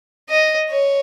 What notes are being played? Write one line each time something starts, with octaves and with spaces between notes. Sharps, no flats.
D#5
C#5